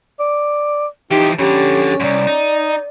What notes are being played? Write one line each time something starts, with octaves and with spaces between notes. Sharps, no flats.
D5
E3 F3 D#4 G4
F2 D3 C#4 G4
C2 F#2 D5
D#4